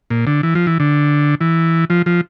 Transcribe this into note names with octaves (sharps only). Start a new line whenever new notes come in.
A#2
D3
E3
F3
E3
D3
E3
F3
F3